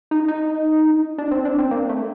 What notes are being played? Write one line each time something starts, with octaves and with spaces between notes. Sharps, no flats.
D#4
D#4
D4
C4
D4
C4
A#3
A3